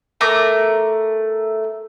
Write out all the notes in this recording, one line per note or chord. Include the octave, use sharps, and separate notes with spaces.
A3 A#4 D6